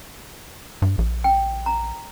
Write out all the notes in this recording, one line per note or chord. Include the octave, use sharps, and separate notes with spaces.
G2
A#1
G5
A#5